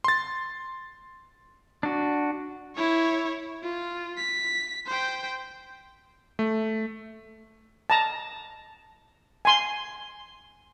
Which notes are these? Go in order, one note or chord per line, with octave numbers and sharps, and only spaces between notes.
C6 A6
D4 F#4
E4 C#5
F4
B6
C5 G5
A3
A5 A#5
G#5 C6